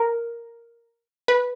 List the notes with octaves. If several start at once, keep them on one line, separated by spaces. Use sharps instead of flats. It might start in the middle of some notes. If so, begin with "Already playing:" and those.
Already playing: A#4
B4